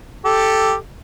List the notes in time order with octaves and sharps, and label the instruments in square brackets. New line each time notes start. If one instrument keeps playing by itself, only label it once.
[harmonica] G4 A4